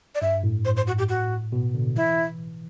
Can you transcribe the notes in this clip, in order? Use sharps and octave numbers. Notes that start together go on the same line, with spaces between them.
D5
G2 E5
A2
C5
C5
F#4
G4
F#4
B2
D3
E3 E4